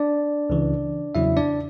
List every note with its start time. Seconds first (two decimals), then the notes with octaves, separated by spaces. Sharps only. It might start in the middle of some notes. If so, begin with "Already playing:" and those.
Already playing: D4 D5
0.50 C#2 C#3 E3
1.15 E2 C#3 F#3 E4 E5
1.37 D4 D5